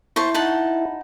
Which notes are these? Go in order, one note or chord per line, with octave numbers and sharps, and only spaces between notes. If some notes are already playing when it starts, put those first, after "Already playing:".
E4 C5 A5 C#6
D#4 F#5 A5